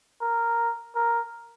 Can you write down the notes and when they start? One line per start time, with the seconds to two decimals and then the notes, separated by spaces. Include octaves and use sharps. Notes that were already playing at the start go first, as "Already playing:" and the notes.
0.21 A#4
0.95 A#4